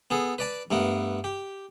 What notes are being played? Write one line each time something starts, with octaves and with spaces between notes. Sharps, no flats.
B3 G#4 A4
B4 D5 A5
G2 A3 B3 A#4
G4